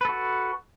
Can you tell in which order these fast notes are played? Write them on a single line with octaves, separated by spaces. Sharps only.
B4 A4 F#4